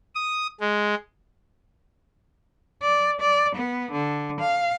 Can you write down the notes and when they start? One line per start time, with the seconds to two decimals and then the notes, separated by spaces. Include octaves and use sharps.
0.15 D#6
0.60 G#3
2.82 D5
3.21 D5
3.55 B3
3.92 D3
4.40 F5